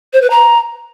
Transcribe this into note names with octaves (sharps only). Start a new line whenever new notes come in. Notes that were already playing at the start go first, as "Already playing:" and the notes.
C5
B4
A#5